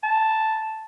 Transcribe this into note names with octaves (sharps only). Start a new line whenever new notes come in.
A5